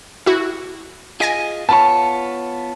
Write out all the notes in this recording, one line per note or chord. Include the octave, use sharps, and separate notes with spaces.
E4 F#4
F4 G#4 D#5 G#5 A#6 D7
B3 F4 C#5 A5 B5